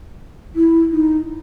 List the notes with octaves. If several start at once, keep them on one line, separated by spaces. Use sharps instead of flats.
E4
D#4